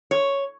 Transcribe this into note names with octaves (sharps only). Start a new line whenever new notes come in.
C#5